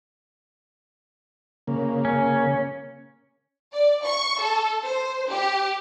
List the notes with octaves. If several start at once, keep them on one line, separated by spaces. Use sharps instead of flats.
C#3 A#3
C#4
D5
C#6
A4
C5
G4